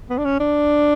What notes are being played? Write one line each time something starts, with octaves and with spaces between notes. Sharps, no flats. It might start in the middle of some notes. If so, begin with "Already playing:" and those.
B3
D4
C#4
D4